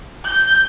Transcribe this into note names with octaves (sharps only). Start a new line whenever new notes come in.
G6